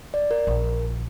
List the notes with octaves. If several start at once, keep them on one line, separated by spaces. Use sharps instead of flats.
D5
A#4
A#1